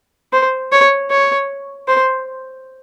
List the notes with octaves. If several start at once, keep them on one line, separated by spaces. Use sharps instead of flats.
C5
C#5
C#5
C5